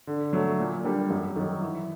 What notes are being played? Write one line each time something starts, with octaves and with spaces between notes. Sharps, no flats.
D3
F#3 A3
A#2
G3 A#3 D4
F#2
D#3 F#3
E3